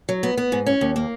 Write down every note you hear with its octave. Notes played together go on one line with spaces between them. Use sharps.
F#3
B3
B3
G#2
C#4
D#2
A#3